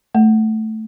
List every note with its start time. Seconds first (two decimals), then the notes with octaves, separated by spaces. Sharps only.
0.15 A3